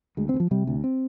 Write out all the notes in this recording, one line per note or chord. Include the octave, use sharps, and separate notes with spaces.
D2 G#3
C4
D2
F3
C3 G3
D2
C4